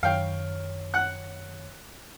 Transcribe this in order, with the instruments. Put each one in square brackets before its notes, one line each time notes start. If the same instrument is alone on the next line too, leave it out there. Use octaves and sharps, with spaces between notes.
[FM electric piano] F#2 D#3 C#5 [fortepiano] F5 G5
[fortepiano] F#5 F#6